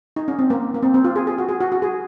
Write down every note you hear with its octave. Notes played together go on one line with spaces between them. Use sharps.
D#4
C#4
C4
A#3
A#3
C4
C4
F4
G#4
G#4
F#4
G#4
F#4
F#4
G#4